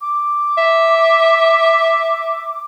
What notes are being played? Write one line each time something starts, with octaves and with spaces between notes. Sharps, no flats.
D6
E5